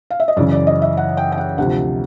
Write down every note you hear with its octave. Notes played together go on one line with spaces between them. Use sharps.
F5
E5
D#5
F#2 C#3 E3 D5
D5
D#5
E5
F#5
G5
G5
F#5
D2 C3 F3 F#5